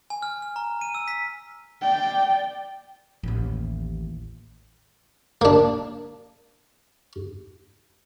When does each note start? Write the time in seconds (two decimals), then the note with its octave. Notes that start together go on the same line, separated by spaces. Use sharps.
0.10 G#5
0.22 F6
0.42 F6
0.56 A#5
0.81 D#7
0.95 E6
1.08 B6
1.81 D5 G5
3.23 A1 D#2
5.41 A#3 D4